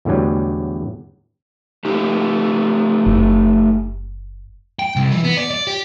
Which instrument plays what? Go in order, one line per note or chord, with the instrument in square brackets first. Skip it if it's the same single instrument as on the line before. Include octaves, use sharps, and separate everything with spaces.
[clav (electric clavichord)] E2 A2 D3 F#3 G3
[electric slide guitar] A3 D#4 G4
[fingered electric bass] F#1
[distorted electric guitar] G5
C2
E3
B3
D5
D5
G4